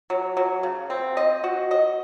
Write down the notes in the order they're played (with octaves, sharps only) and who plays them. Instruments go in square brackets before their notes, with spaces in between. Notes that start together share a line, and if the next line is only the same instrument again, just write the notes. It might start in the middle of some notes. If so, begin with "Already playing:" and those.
[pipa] F#3
F#3
C#3
C4
D#5
F#4
D#5